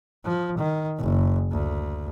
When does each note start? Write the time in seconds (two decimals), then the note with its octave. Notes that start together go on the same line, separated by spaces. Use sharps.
0.24 F3
0.58 D#3
0.99 F#1
1.51 D2